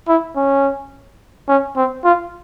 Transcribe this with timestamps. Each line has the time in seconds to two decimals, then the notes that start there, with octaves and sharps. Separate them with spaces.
0.08 E4
0.36 C#4
1.48 C#4
1.76 C4
2.04 F4